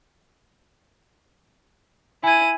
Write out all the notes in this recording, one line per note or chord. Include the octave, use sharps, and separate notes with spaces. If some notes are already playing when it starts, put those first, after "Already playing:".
E4 G#5 G#6 D#7